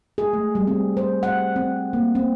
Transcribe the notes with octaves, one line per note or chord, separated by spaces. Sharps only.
G#4
A3
G3
C4
C5
F#5
C4
A#3
C4